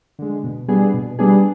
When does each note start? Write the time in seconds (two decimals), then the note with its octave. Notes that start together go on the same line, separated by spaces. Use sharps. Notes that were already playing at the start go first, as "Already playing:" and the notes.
0.19 D3 G#3
0.44 B2
0.68 G3 B3 D4 G#4
0.94 B2
1.19 G3 B3 D4 G#4